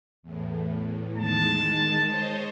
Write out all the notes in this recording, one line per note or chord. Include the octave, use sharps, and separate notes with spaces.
E2 A2
D#3 G#3 A5
C5 C#5 D#5